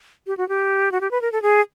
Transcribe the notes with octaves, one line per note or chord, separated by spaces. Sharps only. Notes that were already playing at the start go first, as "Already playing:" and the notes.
G4
F#4
G4
F#4
G4
B4
A#4
A4
G#4